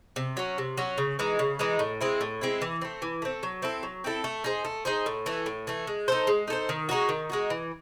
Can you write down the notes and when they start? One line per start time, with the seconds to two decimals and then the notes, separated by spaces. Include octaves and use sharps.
0.16 C3
0.37 F#3 C#4
0.58 C3
0.77 F#3 C#4
0.98 C#3
1.19 E3 G#3 D#4
1.39 C#3
1.59 E3 G#3 D#4
1.79 A2
2.01 G#3 C4 E4
2.21 A2
2.41 G#3 C4 E4
2.62 E3
2.82 A3 C4
3.02 E3
3.22 A3 C4
3.43 F#3
3.62 C4 E4 A4
3.83 F#3
4.04 C4 E4 A4
4.24 A3
4.44 D#4 G#4 C5
4.65 A3
4.85 D#4 G#4 C5
5.06 A2
5.26 E3 A3
5.46 A2
5.67 E3 A3
5.87 G#3
6.08 D#4 A4 C5
6.27 G#3
6.48 D#4 A4 C5
6.69 D#3
6.89 G#3 D#4 F#4
7.09 D#3
7.30 G#3 D#4 F#4
7.50 E3